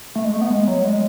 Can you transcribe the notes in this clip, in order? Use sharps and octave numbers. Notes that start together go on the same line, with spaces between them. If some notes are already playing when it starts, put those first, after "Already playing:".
A3
G#3
A3
B3
G#3
F#3
G#3